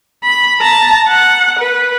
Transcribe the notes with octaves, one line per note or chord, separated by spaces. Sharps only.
B5
A5 A#5
F#5
B4